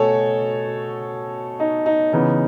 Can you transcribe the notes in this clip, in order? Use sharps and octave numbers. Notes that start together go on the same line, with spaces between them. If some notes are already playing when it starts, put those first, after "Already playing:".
Already playing: B2 A3 A4 C#5 G#5
D#4
D#4
C#3 E3 B3 D#4